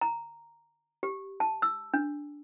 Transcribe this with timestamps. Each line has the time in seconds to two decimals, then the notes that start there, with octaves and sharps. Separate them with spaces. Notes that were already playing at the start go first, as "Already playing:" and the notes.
0.01 A#5
1.03 G4
1.40 A5
1.62 E6
1.94 D4